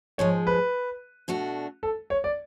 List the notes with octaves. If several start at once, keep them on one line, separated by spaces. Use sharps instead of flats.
G#2 F3 G#3 C#5
B4
B2 A3 D4 F#4
A4
C#5
D5